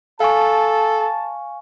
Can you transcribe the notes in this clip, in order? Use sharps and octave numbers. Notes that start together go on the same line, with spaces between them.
A4 F5 G#5 A5 C#6